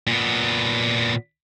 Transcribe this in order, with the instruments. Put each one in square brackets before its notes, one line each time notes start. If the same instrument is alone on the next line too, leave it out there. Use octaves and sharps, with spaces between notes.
[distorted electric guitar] A#2 B3